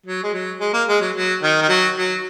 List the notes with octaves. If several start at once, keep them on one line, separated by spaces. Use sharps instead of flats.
F#3
G#3
F#3
G#3
A#3
G#3
F#3
F#3
D#3
D#3
F#3
F#3